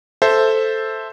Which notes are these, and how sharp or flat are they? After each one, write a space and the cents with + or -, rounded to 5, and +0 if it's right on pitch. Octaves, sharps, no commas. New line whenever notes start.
A4 +0 C5 +0 E5 +0